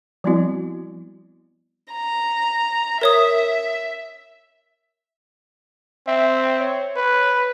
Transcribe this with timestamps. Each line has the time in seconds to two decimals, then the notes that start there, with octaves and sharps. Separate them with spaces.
0.24 F3 G3 B3 C4 E4 F#4
1.92 A#5
3.01 A#4 C#5 E5 D#6
6.07 C4 E5
6.60 C#5
6.96 B4